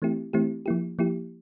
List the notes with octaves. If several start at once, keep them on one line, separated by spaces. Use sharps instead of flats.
E3 A3 C4 E4 G4
E3 A3 C4 E4 G4
F3 A#3 E4 G4
F3 A#3 E4 G4